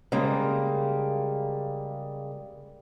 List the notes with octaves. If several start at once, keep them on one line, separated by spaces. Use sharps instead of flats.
C#3 G3 G#3 A#3